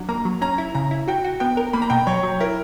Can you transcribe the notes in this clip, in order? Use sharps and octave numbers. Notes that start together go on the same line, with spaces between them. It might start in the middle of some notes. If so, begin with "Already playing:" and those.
Already playing: F#3 D4
A#3 A#5
F#3
C#4 A#5
E4
C#3 A#5
E4
F#4 G5
F#4
B3 G5
A#4
A#3 B5
A#5
B2 G5
F#3 C#5
F#3
E4 A#4